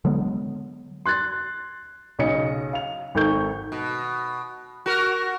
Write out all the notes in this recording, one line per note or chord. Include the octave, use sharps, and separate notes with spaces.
D3 F#3 G#3 B3
C6 F#6 G#6 A6
B1 C#3 C#5 D#5 C#7
F5 F7
G#1 D#3 A4 C#6 G6
B2
F#4 A#4